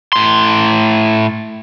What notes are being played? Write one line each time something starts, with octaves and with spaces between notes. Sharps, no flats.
A2 C6